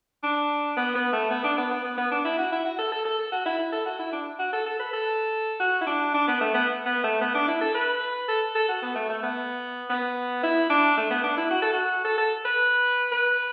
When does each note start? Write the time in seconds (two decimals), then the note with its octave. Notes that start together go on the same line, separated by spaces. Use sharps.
0.23 D4
0.77 B3
0.95 B3
1.13 A3
1.31 B3
1.44 D4
1.58 B3
1.71 B3
1.84 B3
1.98 B3
2.11 D4
2.25 E4
2.38 F#4
2.52 E4
2.65 F#4
2.78 A4
2.92 A4
3.05 A4
3.19 A4
3.32 F#4
3.46 E4
3.59 E4
3.72 A4
3.86 F#4
3.99 E4
4.13 D4
4.39 F#4
4.53 A4
4.66 A4
4.79 B4
4.93 A4
5.60 F#4
5.81 E4
5.87 D4
6.14 D4
6.28 B3
6.41 A3
6.54 B3
6.86 B3
7.03 A3
7.21 B3
7.35 D4
7.48 E4
7.61 A4
7.75 B4
8.29 A4
8.55 A4
8.69 F#4
8.82 B3
8.95 A3
9.09 A3
9.23 B3
9.90 B3
10.43 E4
10.70 D4
10.97 A3
11.11 B3
11.24 D4
11.37 E4
11.51 F#4
11.62 A4
11.73 F#4
12.05 A4
12.18 A4
12.45 B4
13.12 B4